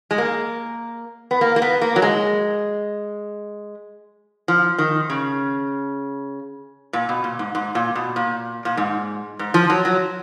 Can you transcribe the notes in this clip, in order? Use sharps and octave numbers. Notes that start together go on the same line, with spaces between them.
G#3
A#3
B3
A#3
A#3
B3
A#3
F#3
G#3
F3
D#3
C#3
A#2
B2
A#2
G#2
G#2
A#2
B2
A#2
A#2
G#2
G#2
F3
F#3
F#3